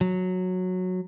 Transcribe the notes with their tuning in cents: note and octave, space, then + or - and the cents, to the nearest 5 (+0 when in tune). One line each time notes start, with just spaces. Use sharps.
F#3 -10